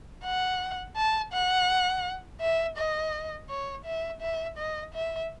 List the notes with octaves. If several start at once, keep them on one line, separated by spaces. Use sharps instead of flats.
F#5
A5
F#5
E5
D#5
C#5
E5
E5
D#5
E5